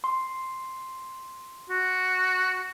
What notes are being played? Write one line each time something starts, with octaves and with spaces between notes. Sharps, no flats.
C6
F#4